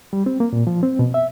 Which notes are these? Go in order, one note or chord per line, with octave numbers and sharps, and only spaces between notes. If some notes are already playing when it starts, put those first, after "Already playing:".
G3
C4
A#3
A#2
F3
C4
B2
E5